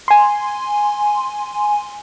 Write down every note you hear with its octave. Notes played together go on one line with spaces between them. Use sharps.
G#5 C6